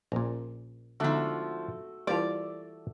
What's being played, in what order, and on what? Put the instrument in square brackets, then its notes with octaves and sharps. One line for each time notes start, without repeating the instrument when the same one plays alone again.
[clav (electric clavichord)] A#1 A#2 [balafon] C#4
[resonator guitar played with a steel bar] D3 F3 [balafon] G#3 B3 D#4 [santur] A3 F#4
[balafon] E3 E4 A5 [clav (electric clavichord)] G3 A#3 F4 [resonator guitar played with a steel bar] D5